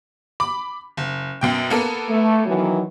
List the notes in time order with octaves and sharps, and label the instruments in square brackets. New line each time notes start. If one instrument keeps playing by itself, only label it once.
[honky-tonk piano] B5 D6
F#1
F#2 B2 G5
A#3 B3 A4
[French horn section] A3
D#3 E3 F#3